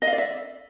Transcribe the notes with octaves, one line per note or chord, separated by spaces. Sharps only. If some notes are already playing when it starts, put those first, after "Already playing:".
D#5
F5
D5
E5